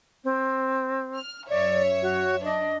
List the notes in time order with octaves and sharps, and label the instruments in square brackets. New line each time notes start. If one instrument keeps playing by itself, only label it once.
[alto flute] C4
[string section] F6
[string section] F#2 C#5 E5 [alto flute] D5
[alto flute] F#4
[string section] D4 [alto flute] D#5